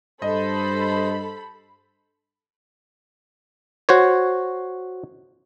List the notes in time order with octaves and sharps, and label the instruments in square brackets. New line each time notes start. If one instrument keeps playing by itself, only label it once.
[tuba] G2 [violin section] A4 B5 [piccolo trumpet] C5 [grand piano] D#5
[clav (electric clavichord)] F#4 C5 C#5